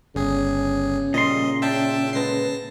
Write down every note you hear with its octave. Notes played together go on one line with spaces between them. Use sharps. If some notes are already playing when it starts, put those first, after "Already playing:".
G1 C#3 G#4
A#2 F3 G3 D#5 C6
D4 F4 E5 G5 A5
D3 G#3 B4 A5 A#6 C7